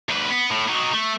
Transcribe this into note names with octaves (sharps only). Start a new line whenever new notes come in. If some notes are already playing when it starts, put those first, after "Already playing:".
D2 B4
B3
A2
F#3 D#4
A3